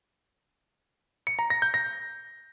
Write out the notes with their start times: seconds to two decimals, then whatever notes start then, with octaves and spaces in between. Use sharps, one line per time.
1.27 C#7
1.39 A#5
1.50 A#6
1.62 G6
1.74 A#6